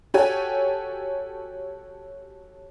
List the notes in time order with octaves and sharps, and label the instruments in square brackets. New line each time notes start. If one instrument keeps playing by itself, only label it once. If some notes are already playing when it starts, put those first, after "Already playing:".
[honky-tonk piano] F#4 G4 A4 C#5 G#5